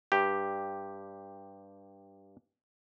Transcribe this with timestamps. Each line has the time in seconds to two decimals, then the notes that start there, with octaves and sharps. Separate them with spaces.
0.12 G2 G4